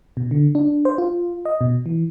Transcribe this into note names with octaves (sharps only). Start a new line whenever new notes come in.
B2
D3
D4
C5
F4
D#5
B2
E3